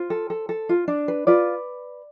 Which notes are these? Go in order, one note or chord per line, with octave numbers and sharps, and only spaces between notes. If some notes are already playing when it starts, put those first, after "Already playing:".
Already playing: F4 C5
A4
A4
A4
F4
D4
B4
F4 B4 D5